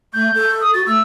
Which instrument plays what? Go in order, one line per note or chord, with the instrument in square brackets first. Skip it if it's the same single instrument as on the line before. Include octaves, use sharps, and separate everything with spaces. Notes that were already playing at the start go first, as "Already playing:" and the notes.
[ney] A3 [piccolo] G6
[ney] A4
[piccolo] D#6
[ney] F#4 [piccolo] A6
[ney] A3 [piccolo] E6